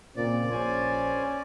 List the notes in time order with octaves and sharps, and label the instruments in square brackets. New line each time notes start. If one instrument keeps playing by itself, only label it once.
[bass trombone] A#2 [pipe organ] C#3 C4 [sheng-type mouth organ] D5
[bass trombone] A#1 [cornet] C#4 [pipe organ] C5 G#5